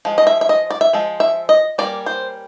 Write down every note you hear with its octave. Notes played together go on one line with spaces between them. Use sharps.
F3 G#3
D#5
E5
E5
D#5
D5
E5
F3 G#3
E5
D#5
G3 A#3 C#4 D5
C5